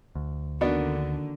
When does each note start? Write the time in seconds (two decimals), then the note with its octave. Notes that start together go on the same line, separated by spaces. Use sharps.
0.15 D2
0.61 D3 D#3 A#3 B3 D4 F#4